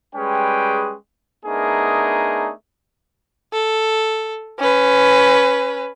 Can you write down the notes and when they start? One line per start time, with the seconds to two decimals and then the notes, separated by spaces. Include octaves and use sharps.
0.16 G3 G#3 C#4 G#4 B4 G5
1.46 A3 B3 D4 D#4 G#4 A#4
3.53 A4
4.59 C#4 B4